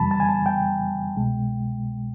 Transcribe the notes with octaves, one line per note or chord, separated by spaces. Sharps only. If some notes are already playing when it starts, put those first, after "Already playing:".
Already playing: F2 C#3 E3 G3 A5 B5
A5
G#5
A5
G5
C2 B2 G#3